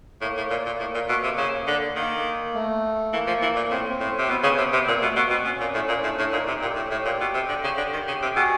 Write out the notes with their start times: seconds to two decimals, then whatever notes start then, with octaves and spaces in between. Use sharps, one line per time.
0.21 A2 A#3
0.37 A2
0.50 A#2
0.66 A#2
0.80 A2
0.94 A#2
1.09 B2
1.24 C3
1.38 C#3
1.67 D3
1.96 D#3 A#3
2.54 A3
3.13 E3 A#3
3.27 F3
3.42 E3
3.56 A#2
3.70 A2 C4
3.90 C4
4.00 A2
4.09 C4
4.19 C3
4.29 B2 B3
4.43 C#3
4.58 C3
4.73 C3
4.87 A#2 A#3
5.02 B2 A3
5.16 B2 A#3
5.30 B2 C4
5.45 B2 C#4
5.60 A#2
5.74 A2
5.88 A#2
6.03 A2 D4
6.18 A2
6.32 A#2 D#4
6.47 C3
6.61 A#2 G4
6.76 A2
6.91 A2
7.05 A#2
7.20 B2
7.34 C3
7.49 D3
7.64 C#3
7.77 D3
7.93 D#3
8.07 C#3
8.22 C3
8.36 B2 F#4 G#4